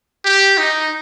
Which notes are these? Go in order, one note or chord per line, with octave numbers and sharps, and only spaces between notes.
G4
D#4